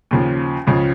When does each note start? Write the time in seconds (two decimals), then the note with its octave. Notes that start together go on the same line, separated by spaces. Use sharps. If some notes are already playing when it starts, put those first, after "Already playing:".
0.11 D#2 C#3 F3
0.67 C#2 C#3 F3